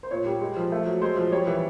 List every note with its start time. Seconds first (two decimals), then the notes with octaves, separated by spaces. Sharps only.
0.03 C5
0.11 A#2 C#5
0.26 G3
0.41 G#3
0.56 F3
0.72 A3
0.86 F#3
1.01 G#3 C5
1.17 F3
1.31 G3 C#5
1.47 E3